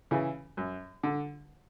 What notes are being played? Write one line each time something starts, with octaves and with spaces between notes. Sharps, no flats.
C#3 E3
F#2
D3